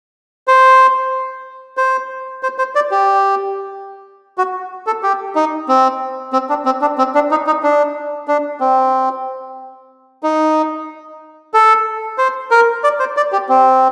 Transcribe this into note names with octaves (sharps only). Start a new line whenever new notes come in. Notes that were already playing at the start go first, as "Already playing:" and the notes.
C5
C5
C5
C5
D5
G4
F#4
A4
G4
D#4
C4
C4
D4
C4
D4
C4
D4
D#4
D#4
D4
D4
C4
D#4
A4
C5
A#4
D5
C5
D5
G4
C4